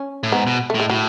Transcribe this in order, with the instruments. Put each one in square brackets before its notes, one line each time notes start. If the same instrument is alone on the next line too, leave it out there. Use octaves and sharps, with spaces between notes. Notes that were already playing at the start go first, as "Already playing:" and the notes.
Already playing: [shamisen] C#4
[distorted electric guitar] A2
[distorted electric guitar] G#2 [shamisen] B3
[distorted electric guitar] B2
[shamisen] A3
[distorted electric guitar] A2
[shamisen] G#3
[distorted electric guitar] A2 [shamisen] F#3